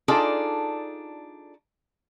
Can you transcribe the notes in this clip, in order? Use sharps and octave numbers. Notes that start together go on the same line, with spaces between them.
D4 D#4 F4 G#4 A4 D5